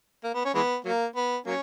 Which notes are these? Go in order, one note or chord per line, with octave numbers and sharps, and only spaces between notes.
A#3
B3
C#4
E3 G#3 B3
F#3 A#3
B3
F#3 A#3 C#4